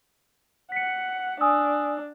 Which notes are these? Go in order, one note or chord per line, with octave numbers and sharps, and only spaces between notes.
F#5 B6 C#7
D4 G#5 D#6 E6